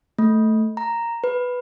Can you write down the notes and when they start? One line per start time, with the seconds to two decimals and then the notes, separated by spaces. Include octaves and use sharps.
0.19 A3
0.77 A#5
1.24 B4